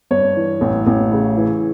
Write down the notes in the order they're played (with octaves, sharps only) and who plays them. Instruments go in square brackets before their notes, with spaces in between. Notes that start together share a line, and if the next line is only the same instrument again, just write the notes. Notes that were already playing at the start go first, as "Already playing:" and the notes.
[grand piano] G2 C#5
E3
A1
A1
C#3
E3